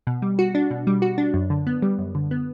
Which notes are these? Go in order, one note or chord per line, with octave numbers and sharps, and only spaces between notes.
B2
G3
F#4
D4
B2
G3
F#4
D4
F#2
D3
B3
G3
F#2
D3
B3